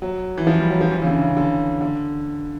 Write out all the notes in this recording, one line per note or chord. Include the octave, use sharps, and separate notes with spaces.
F#3
E3
F3
G3
F#3
F3
E3
C#3
D3
C#3
D3
D3